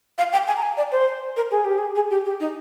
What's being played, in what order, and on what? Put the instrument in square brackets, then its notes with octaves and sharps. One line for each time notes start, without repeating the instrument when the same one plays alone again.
[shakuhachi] F5
G5
G#5
A#5
G#5
D5
C5
A#4
G#4
G4
G#4
G#4
G4
G4
D#4